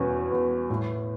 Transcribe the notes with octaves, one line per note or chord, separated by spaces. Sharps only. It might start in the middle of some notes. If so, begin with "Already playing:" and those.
Already playing: E2 B2 C#4
E2
A2